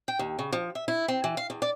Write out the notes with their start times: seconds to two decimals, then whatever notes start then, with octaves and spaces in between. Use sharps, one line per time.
0.08 G5
0.19 D#2
0.39 C#3
0.53 F3
0.75 E5
0.88 E4
1.08 C4
1.24 E3
1.37 F5
1.50 E2
1.62 D5